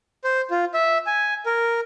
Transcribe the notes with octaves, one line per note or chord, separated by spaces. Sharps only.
C5
F4
E5
G#5
A#4